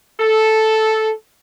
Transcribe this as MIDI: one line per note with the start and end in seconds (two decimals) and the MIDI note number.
0.20 1.11 69